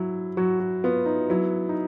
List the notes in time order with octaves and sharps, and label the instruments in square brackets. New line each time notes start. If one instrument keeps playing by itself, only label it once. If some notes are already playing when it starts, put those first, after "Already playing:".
Already playing: [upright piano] F#3 [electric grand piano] E4
[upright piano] F#3 [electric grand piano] F#4
[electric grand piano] F#4
[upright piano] B3 [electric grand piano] F4
[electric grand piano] D#4
[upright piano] F#3 [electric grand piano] E4
[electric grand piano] D#4